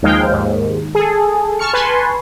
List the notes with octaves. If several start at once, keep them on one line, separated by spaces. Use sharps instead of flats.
D#2 F3 G#3 D#4 F5 G5
D#2 G#2
G#4 A4
A5 C#6 F6 C#7
B4 G#5 A5 C6 C#6